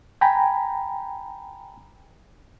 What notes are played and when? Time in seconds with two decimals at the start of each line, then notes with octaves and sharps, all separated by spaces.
0.21 G5 G#5 A#5 B5